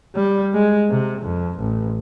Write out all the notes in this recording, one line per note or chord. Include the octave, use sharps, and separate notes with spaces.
G3
G#3
C3
F2
A1